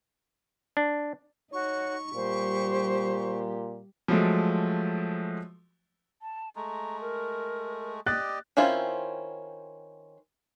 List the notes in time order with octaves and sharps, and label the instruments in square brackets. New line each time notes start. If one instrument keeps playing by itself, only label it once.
[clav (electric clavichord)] D4
[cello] D#4 [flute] F#4 [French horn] C#5 [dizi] C#6
[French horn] A#2 [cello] G3 G4 [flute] C5
[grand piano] F3 F#3 G#3 A3
[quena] A5
[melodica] G#3 A3 [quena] A#5
[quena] A#4
[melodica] G4 D5 D#5 [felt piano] F#6 A6
[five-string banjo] D#3 C4 C#4 E4 F4